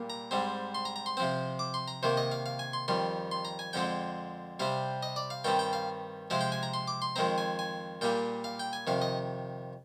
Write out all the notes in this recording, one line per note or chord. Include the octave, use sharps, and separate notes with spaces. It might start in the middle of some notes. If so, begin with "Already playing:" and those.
Already playing: A#2 G3 A#3
A#5
G#2 G3 C4
C6
A#5
A#5
C6
C3 F3 C4
D6
C6
A#5
C3 D#3 A#3 C5
D#5
F5
F5
G#5
C6
F2 D#3 G3 C6
C6
A#5
G#5
F2 D3 G#3 C4 G5
C3 G3 C4 F5
D#5
D5
F5
G2 D#3 G3 C4 G5
G5
F5
C3 F3 G#3 C4 F5
G5
G#5
A#5
C6
D6
C6
F2 D#3 G#3 C4 A#5
G#5
G#5
A#2 G3 A#3 G5
F5
G5
G#5
F2 C3 D#3 F5
D#5